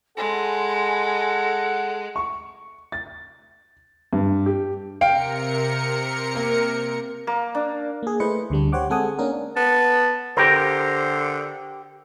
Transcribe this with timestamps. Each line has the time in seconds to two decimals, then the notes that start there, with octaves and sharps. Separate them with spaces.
0.18 G#3 A4 F#5 G#5 B5 C6
2.16 C#6
2.92 A6
4.13 G2
4.46 G4
5.01 C3 A#4 F5 G5 C#7 D7
6.35 A#3
7.27 A#3
7.55 D4
8.03 A#3 G#4
8.20 A3 E4 B4 C5 D#5 C#7
8.50 D2 D3 G3 D4
8.72 G4 C5 C#5 F#5 D6
8.90 G#3 C4 A4 F#5 G#5 D#6
9.19 A#3 C#4 D4 A#4
9.56 B3 A5
10.37 D3 G4 A#4 C5